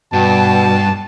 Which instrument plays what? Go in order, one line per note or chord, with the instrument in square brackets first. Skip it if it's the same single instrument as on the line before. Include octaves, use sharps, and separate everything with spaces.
[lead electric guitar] G2 [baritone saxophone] B2 [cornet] A5